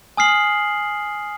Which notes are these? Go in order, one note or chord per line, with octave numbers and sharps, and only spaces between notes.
G#5 D#6 F6 C7 F#7